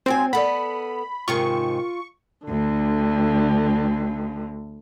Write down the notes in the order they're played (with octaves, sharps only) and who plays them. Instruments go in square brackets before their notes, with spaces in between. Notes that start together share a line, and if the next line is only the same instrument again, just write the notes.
[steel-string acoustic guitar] G#2 F#3 G#5 [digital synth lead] C4
[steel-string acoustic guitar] B3 A4 [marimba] D5 F#5 [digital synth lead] B5
[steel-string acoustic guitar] G#2 C3 D#3 [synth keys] F4 [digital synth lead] C#6
[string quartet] D2 D3